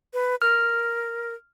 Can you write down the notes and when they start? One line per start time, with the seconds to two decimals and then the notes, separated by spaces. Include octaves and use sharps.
0.14 B4
0.42 A#4 F6